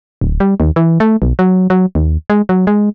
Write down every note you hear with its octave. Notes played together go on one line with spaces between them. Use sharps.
D1
G3
D#2
E3
A3
B1
F#3
F#3
D#2
G#3
F#3
G#3